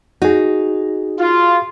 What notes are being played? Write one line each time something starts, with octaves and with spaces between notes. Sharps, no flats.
D#4 F#4 G#4
F4